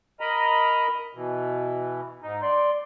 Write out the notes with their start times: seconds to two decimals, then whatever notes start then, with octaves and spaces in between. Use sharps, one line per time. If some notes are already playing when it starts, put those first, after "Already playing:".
0.20 A#4 D#5 A#5 B5
1.14 B2 E3
2.23 G#2 D#4
2.42 D5 C6